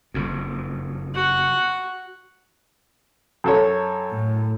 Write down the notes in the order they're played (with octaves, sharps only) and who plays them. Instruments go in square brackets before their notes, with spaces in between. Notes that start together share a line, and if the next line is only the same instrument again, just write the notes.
[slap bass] F#1 F2
[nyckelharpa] F#4 F#5
[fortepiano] F#2 A4 C#5
[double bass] A2